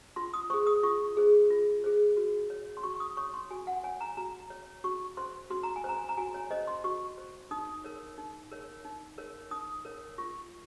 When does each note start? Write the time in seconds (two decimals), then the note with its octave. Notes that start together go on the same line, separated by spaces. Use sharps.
0.16 F4 C6
0.34 D#6
0.50 C5 C#6
0.53 G#4
0.67 D#6
0.83 F4 C#6
1.17 G#4 C5
1.50 F4
1.84 G#4 C5
2.17 F#4
2.50 C#5
2.77 C6
2.83 F#4 C#6
2.94 C#6
3.00 D#6
3.17 C#5 C#6
3.34 C6
3.50 F#4 G#5
3.67 F#5
3.84 C#5 G#5
4.01 A#5
4.17 F#4 A#5
4.50 C#5
4.84 F#4 C#6
5.17 C5 C6
5.50 F#4 C6
5.63 A#5
5.76 G#5
5.84 C5 A#5
6.09 A#5
6.17 F#4 G#5
6.34 C#5
6.51 C5 D#5
6.67 C6
6.84 F#4 C#6
7.18 C5
7.51 D#4 D#6
7.84 A#4 C#5
8.18 D#4
8.52 A#4 C#5
8.85 D#4
9.18 A#4 C#5
9.51 D#4 D#6
9.85 A#4 C#5
10.18 F4 C#6